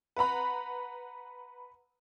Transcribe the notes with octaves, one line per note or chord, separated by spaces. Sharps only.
B4 F#5 A#5 B5